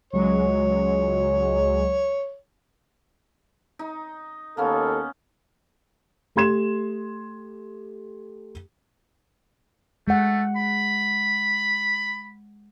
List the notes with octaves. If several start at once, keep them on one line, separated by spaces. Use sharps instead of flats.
C#2 F#3 G#3 C#5
D#4
D#2 A#3 B3 C#4 A4
A3 G4 C6 G#6 E7
G#3 A3 F#5
B5